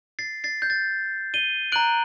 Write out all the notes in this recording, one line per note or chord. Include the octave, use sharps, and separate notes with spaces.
A6 C7
A6 C7
G6
A6
D#7 G7
A#5 F#6 D7 F#7